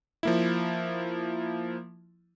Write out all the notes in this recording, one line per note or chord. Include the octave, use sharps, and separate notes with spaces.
F3 A#3 E4